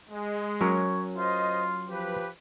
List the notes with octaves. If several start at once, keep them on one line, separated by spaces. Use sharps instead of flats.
G#3
F#3 C#4 A#4 C#5
F4 C5 D#5
F3 G4 B4